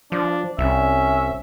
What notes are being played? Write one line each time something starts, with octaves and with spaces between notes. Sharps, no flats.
F3 D4
C2 C#4 E5